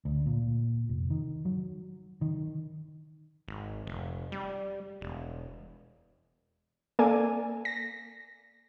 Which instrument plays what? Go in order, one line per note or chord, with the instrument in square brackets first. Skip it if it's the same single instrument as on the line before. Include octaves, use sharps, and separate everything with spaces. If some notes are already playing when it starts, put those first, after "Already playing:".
[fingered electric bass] D2
A#2
F1
D#3
F#3
D#3
[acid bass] G#1
F1
G3
E1
[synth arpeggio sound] A#3 A4 D5 G#5
A#6